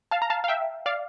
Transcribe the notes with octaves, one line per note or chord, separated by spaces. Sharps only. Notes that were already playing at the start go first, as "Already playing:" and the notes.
F5 A5
A#5
F5 A5
F5
E5 G5
D5 F5